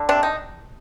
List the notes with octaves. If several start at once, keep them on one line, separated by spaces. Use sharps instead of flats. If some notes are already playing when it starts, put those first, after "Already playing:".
Already playing: D3
C3 D4
D#4